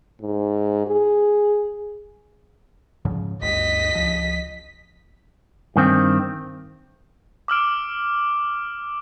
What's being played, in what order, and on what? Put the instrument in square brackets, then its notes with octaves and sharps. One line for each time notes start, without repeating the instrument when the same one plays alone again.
[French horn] G#2
G#4
[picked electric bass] G#2 C#3 F3
[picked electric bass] G1 D2 [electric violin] D#5 B6
[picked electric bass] C#2 F3
[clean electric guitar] G2 D#3 C4
[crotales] D6 E6 F6 D7